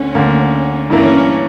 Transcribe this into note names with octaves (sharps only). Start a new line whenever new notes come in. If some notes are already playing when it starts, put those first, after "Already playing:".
Already playing: D2 D3 C#4
D2 D3 A#3
G2 E3 A#3 C#4 E4 A#4